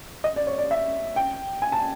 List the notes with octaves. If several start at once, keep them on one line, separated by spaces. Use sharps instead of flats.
D#5
D5
C#5
D5
E5
G5
G#5
A5